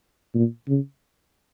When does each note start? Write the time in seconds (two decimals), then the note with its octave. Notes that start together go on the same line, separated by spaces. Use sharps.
0.35 A#2
0.68 C#3